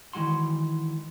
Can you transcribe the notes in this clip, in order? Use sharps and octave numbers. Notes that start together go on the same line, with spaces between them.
D#3 E3 G#3 F#4 C6